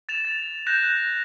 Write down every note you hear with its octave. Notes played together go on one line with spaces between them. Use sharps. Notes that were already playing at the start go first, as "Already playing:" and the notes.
A6 E7 F7
A6
F#6 G6 A#6 E7